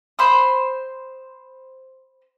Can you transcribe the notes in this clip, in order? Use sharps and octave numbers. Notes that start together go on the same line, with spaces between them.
C5 B5 C6 D#6